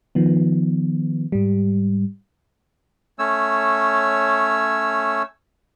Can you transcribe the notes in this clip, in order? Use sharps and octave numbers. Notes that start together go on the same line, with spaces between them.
D#3 F3 B3
G#2 G3
A3 C#4 C#5 E6